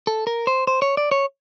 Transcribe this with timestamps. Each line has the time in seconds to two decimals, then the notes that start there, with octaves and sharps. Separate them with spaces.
0.07 A4
0.27 A#4
0.47 C5
0.67 C5
0.82 C#5
0.97 D5
1.11 C#5